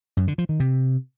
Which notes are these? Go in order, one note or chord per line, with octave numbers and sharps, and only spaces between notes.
F#2
D3
F3
D#3
C3